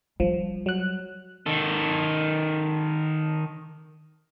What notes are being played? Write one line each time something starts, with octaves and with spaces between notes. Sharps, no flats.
F3 G3
F#3 F#6
D#3 A4